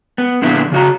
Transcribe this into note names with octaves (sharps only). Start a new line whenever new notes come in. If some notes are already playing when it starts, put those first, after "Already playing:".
B3
A#2 D3 F3 B3 E4
C#3 F#4 A#5